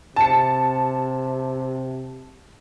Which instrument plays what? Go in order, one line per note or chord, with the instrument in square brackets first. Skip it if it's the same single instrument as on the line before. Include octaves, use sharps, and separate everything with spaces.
[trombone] C3 [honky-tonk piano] A5 C#7